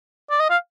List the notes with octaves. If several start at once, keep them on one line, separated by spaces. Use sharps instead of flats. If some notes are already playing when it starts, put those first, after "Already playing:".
D5
D#5
F5